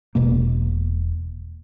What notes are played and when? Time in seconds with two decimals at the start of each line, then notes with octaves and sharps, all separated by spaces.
0.15 E1 B2 A#3